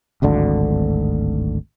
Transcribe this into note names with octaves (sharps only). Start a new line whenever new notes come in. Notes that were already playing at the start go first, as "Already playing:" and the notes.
D1 G#1 D2 D3